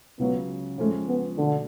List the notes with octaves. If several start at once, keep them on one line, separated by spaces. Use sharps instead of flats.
C#2 C#3 F#3 B3
F2 F3 G#3 A3 C#4
B3
B2 D3 A3 D4